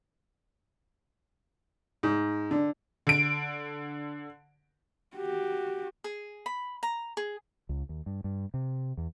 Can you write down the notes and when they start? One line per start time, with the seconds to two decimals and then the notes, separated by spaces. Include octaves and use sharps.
2.03 G#2
2.51 D3
3.07 D3 D7
5.16 F#4 G4
6.04 G#4
6.46 B5
6.83 A#5
7.17 G#4
7.69 C#2
7.89 D#2
8.06 G2
8.24 G2
8.54 C3
8.97 E2